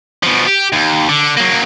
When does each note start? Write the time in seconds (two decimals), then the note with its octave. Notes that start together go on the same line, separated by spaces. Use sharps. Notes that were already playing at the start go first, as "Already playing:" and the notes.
0.23 B2 F3
0.46 G4
0.72 D#2
1.09 D3
1.37 F#3 A#3